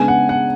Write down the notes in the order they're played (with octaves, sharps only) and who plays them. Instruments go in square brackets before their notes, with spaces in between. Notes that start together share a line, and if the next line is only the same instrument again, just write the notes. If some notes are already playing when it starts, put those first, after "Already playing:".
Already playing: [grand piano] C#3 G#3 B3 D4 [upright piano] G#5
[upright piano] F#5
F#5